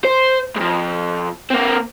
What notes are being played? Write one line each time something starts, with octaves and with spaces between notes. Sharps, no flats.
C5
F2 G#2
A#3 C4